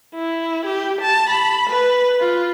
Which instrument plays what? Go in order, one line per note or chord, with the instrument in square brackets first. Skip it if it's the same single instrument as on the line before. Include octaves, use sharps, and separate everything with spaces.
[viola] E4
G4
A5
B5
B4
F4